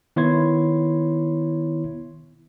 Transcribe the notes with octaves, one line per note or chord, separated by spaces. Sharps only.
D#3 B3 E4 C#5 C6 G#6